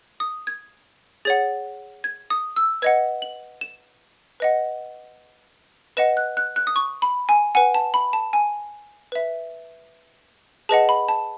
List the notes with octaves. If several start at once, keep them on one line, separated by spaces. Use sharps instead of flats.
D#6
G#6
G#4 C#5 F#5 A6
G#6
D#6
E6
B4 D#5 F#5 G#6
F#7
E7
B4 D#5 F#5
B4 D#5 F#5 E7
F#6
F#6
F#6
D#6
C#6
B5
G#5
B4 F#5 G#5
A5
B5
A5
G#5
B4 E5
G#4 B4 D#5 F#5 A5
B5
A5